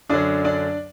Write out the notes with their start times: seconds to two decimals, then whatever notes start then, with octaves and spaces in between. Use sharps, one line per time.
0.09 F#2 D3 F#3 D4 D5
0.44 D4 D5